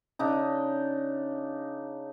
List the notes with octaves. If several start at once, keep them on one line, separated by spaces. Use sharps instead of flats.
C#3 D4 D#4